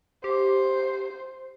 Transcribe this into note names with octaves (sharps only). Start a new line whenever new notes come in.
G4 C5